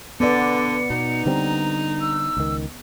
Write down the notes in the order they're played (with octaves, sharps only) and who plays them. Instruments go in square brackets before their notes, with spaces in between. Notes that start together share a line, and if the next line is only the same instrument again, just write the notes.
[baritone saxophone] D3 [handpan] B3 D5 [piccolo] C#7
[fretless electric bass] B2 [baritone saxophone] D#4
[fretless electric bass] D3 G3 C4 [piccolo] A#5
[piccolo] E6
[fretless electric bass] C#2 D#3